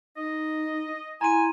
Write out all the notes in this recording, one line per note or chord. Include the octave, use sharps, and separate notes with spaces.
D#4 D#5
E4 G#5 A#5 C6 D#7